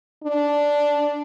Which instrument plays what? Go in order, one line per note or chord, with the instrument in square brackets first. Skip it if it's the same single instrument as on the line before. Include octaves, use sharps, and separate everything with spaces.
[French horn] D4